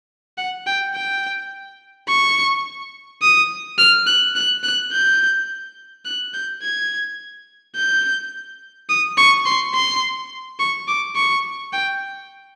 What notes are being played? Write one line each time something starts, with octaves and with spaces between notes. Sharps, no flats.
F#5
G5
G5
C#6
D#6
F6
F#6
F#6
F#6
G6
F#6
G6
G#6
G6
D#6
C#6
C6
C6
C#6
D6
C#6
G5